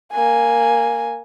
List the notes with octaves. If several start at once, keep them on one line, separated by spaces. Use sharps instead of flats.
A#3 G#5